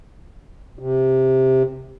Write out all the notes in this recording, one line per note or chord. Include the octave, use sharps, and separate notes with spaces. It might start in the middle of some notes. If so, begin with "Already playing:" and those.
C3